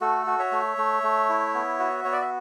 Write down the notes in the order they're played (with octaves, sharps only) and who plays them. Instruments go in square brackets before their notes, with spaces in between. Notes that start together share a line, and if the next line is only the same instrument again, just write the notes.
[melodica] A3 F#4 A4
F#4
C#5 E5
A3
A3
A3
E4
B3
F#4
B3 C#5
D5
E5